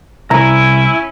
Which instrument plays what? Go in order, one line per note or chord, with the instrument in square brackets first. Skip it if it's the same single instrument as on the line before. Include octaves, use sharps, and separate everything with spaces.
[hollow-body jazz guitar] C2 A#5 [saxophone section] C#4 E4